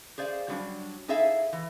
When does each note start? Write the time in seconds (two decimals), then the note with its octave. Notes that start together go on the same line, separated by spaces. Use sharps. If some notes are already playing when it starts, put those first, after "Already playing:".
0.18 G#4 C5 D5 F5
0.48 F#3 G3 D4
1.08 D#4 E4 G#4 A4 E5 F5
1.53 E3